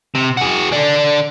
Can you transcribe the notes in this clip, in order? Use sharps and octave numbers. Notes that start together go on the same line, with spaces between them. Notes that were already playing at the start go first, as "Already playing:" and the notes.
C3
F#4 G#4
D3 D4